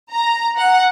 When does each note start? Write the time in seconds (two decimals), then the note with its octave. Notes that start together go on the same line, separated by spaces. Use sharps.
0.11 A#5
0.57 F#5